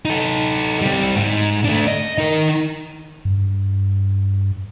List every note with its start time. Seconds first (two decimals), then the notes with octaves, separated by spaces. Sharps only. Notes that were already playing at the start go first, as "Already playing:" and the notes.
0.05 D#4 A4
0.82 G3 C4
1.16 G#2
1.65 A3 D4
1.88 D#5
2.18 D#4 A#4
3.25 G2